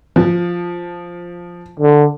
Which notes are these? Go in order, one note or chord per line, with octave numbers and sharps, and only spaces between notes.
F3
D3